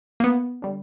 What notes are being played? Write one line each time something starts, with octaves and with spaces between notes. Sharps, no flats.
A#3
B3
D3 G3